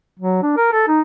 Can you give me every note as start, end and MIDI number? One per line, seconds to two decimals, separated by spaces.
0.20 0.42 54
0.42 0.56 62
0.57 0.69 70
0.73 0.85 69
0.88 1.01 63